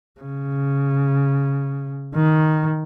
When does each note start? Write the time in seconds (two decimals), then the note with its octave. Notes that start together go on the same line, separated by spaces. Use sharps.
0.21 C#3
2.15 D#3